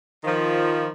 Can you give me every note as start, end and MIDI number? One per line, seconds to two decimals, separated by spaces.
0.24 0.88 51
0.24 0.88 53